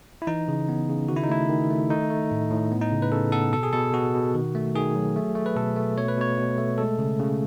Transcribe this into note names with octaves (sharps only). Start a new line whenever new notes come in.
E4
E3 D#4
C#3
B3
C#3
D#3 F#4
E4
D#4
A3 E4
D#3
A3
A3 D#4
A3
A2
A2
B3
D#4
C#3
B4
C#3 A4
B3 A4
B2 A4
G#4
B2 A4
B2 F#4
B2
D#3
A3
D#3 G#4
F#3
A3
A3
B4
B2 A4
A3
B2 C#5
B4
B2 C#5
B2
A3
G#3 A4
C#3
C#3